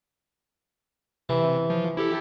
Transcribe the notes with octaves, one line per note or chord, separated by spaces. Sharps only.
C3 E3
F3
E4 G4 A4